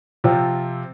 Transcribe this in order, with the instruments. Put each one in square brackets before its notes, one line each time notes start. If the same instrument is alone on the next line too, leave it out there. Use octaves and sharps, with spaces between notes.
[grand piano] C3 F3 C4 F4